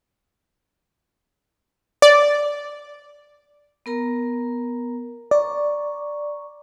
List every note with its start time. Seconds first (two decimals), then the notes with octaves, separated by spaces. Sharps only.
2.02 D5
3.86 B3 A#4 A#5
5.31 D5 A#5 C#6